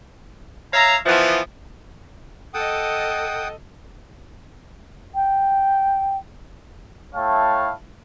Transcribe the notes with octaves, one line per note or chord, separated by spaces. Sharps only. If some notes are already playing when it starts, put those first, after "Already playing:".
C#5 E5 F5 A#5
E3 F3 B3
A4 D#5 F#5 G5 D#6
G5
A3 E4 C#5 F5 G5 A5